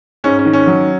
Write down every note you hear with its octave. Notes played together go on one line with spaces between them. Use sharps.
G#2 C#4
C#4
D#3
C#4
F#3